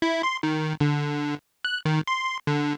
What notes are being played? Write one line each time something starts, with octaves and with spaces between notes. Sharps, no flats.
E4
C6
D#3
D3
F#6
D#3
C6
D3